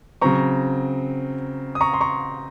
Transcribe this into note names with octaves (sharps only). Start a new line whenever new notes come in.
C#3 F#3 C4 A#5 C#6
D#6
A#5 C#6
C6
A#5 C#6